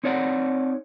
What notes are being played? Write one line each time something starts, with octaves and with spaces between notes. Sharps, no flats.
C4 D#4 C#5 D5 E5 F#5